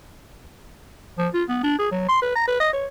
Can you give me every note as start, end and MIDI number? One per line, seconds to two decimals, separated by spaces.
1.18 1.28 53
1.34 1.43 65
1.49 1.61 59
1.63 1.77 62
1.79 1.89 68
1.92 2.05 54
2.09 2.21 84
2.22 2.33 71
2.35 2.47 82
2.48 2.57 71
2.60 2.70 75
2.73 2.87 73